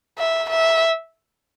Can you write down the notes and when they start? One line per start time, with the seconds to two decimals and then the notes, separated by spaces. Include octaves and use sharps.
0.18 E5
0.50 E5